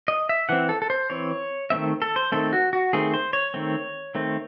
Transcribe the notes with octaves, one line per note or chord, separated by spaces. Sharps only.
D#5
E5
E3 C4 F#5
A4
A4
C5
E3 C4 C#5
D#3 A3 C4 E5
A4
C5
D#3 A3 C4 A4
F#4
F#4
D#3 A3 C4 G#4
C5
C#5
D#3 A3 C4
D#3 A3 C4